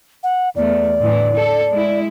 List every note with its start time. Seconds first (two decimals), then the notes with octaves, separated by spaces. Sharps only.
0.23 F#5
0.56 E2 A3 D5
0.99 A2 D3 E3
1.35 A4
1.70 G#3 E4